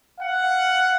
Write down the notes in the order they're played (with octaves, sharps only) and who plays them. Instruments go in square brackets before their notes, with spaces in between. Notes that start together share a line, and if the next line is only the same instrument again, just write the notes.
[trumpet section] F5 F#5